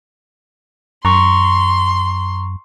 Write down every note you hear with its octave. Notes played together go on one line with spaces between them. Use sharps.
F#2 A#5 C6 C#6